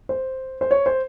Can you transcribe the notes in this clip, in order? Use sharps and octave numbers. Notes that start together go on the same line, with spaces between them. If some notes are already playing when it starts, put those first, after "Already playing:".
C5
C5
C#5
C5